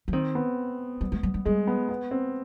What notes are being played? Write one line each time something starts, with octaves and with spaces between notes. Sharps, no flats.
F3
D#3 C4
B3
G3
G#3
G3
G3
G3 G#3
B3
B3
C4